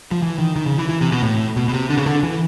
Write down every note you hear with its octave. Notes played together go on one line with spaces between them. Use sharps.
F3
E3
D#3
D#3
C#3
E3
E3
C3
B2
A2
B2
B2
C3
D3
C#3
D3
E3